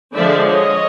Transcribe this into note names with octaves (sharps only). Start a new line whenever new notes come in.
D3 F3 G#3 D5 E5
C#5 D#5